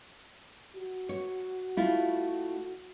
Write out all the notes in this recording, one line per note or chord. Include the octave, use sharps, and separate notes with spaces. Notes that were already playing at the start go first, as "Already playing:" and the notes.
F#4
C#5
A3 E4 F4